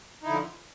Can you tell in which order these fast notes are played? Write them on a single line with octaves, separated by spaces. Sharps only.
D#4 E4 D3 F3